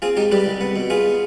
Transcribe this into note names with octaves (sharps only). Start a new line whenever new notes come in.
C4 F4 G#4
G#2 D#4 G4
G3 G4 B4
C2
B3
B2
B3 F4 G#4